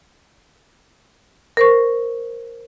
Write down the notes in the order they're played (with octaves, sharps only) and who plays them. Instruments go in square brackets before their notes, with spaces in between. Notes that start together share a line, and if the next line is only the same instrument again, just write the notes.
[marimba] A#4 C5 C#6